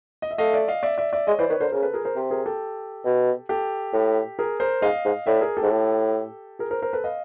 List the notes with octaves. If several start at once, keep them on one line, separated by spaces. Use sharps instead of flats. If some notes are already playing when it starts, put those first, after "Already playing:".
D#5
E5
A3 D#5 F5
D5 E5
D#5 F5
D5 E5
D5 E5
D5 E5
G#3 C#5 D#5
E3 C5 D5
D#3 B4 C#5
D3 A#4 C5
C#3 A#4 C5
A4 B4
G#4 A#4
A#4 C5
C3
G#4 A#4
G4 A4
B2
G4 A4
A2
G#4 A#4
A#4 C5
G#2 D#5 F5
G#2
A2 D5 E5
G#4 A#4
G4 A4
G#2
A2
G#4 A#4
A#4 C5
A#4 C5
A4 B4
D#5 F5